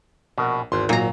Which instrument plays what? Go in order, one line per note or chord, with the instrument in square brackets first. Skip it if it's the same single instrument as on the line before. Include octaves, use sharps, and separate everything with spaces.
[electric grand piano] A#1 A#4 F#5 [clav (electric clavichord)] B2
[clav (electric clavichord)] G#1 [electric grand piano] E2 C6
[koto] A#2 A#5 [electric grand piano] F#3